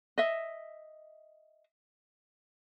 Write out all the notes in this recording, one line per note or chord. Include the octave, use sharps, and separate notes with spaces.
D#5 E5